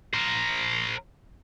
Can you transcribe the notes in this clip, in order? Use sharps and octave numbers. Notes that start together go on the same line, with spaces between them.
A#4 C5